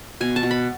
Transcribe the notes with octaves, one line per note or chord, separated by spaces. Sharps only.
B2 G#5
A5
B2
B5